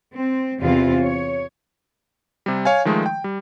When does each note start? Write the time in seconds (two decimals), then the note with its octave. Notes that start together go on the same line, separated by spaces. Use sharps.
0.14 C4
0.60 E2 C3 E3 C4 F4 F5
1.01 C#5
2.46 C3 G3
2.65 C#5 F5 G#5
2.85 D#3 F3 G#3 A3
3.06 G5
3.24 G3